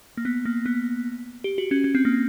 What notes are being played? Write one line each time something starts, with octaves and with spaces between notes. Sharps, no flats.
A#3
B3
A#3
B3
G4
F#4
C#4
C#4
C4
A#3